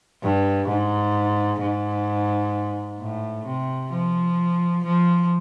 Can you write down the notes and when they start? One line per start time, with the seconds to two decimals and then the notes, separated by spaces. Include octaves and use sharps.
0.23 G2
0.68 G#2
1.61 G#2
3.00 A2
3.45 C3
3.91 F3
4.84 F3